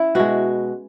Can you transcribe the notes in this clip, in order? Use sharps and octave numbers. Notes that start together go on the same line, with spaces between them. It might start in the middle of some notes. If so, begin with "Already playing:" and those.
Already playing: C#4 E4
B2 G#3 F#4